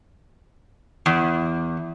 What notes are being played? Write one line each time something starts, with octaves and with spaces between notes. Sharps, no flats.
E2